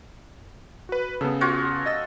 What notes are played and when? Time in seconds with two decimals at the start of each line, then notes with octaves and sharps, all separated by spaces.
0.89 F#4 B4
1.21 C#3 B3 A4
1.41 F4 F#4 C#5
1.86 D#5 E6 A6